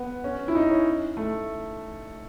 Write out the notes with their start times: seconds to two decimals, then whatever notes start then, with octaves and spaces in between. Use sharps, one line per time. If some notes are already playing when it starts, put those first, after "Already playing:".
Already playing: B3
0.24 C#4
0.48 E4
0.55 D#4
0.71 C#4
1.17 A3